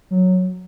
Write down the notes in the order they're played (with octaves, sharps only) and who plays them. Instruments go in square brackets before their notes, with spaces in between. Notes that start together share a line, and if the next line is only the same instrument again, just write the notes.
[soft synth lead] F#3